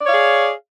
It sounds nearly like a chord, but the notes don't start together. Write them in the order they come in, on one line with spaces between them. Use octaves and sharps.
D5 C#5 F5 G#4